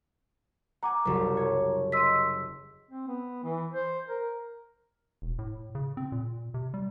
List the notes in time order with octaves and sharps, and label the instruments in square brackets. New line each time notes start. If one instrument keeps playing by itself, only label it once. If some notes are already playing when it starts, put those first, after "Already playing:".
[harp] F#5 G#5 [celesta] A#5 D6
[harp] F#1 C2 F#4
C#5 G#6
[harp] D#5 D#7 [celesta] C6 E6 B6
[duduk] C4
B3
E3
C5
A#4
[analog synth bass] E1
A2
C#3
C4
A#2
C3
G3